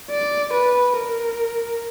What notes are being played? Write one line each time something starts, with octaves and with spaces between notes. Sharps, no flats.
D5
B4
A#4